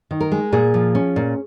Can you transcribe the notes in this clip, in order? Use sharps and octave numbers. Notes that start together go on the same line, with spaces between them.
D#3
A#4
G#3
A#2 G#4
F3
C#4
A#2